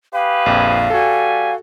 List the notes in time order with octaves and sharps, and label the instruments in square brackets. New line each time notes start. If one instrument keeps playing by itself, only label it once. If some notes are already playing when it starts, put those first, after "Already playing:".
[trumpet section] G4 G#4 B4 [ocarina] F5
[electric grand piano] A#1 F2
[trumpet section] G3 G#5 [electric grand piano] F#4 A4